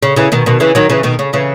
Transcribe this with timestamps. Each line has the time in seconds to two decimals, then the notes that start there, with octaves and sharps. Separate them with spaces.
0.03 C#3
0.16 C#3 E3
0.32 B2 D#3
0.46 B2 D#3
0.60 C#3 E3
0.75 D#3 F#3
0.90 C#3 E3
1.03 B2 D#3
1.19 C#3
1.33 C#3 E3